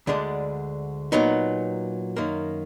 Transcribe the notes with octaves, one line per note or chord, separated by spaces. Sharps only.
D2 D3 G#3 D4
A#2 F#3 B3 D#4
F#2 D#3 A#3